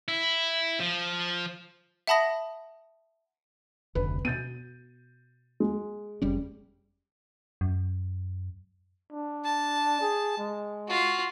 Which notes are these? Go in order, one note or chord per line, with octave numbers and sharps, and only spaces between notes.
E4
F3
E5 F#5 A5 B5 D#6 A#6
F1 D2 B4
B2 B3 G6 A6 D#7
G#3
F1 G3 C#4
F#2
D4
A5
G#4
G#3
F4 F#4